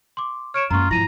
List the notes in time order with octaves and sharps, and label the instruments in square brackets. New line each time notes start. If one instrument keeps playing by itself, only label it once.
[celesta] C6 D6
[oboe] C#5 [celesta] F6 D7 E7
[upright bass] F#2 A#3 [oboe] F4 [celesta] A#5 C#6
[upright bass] G#1 F3 [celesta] E4 D#7 [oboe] A#5